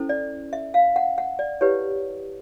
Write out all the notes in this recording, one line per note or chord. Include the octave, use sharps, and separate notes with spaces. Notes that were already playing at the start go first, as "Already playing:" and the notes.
Already playing: C#4 E4 A4 C5
D5
E5
F5
F#5
F#5
D5
E4 G4 B4 C#5